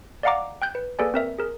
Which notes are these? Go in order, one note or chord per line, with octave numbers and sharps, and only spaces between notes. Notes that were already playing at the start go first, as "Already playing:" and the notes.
D5 D#5 F5 F#5 A#5 D6
G5 F#6 G6
B4
A#3 G#4 A4 B4 D5 G#5
C4 A#4 E5
G#4 A#4